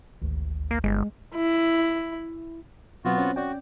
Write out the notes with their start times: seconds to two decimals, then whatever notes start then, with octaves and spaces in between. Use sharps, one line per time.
0.22 G#1 D2
0.71 A#3
0.84 G1 G#3
1.35 E4
3.05 B2 F#3 B3 C4 F4 F#4
3.18 C4 C#4
3.36 C#4 F#4 D5 G5